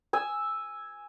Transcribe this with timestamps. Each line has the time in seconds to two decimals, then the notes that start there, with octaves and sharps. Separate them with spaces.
0.13 G#5 E6